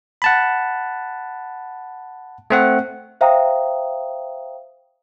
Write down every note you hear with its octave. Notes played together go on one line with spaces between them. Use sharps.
F#5 A5 B5
A3 C4 F#5
C5 E5 F5 G5 A#5 D#6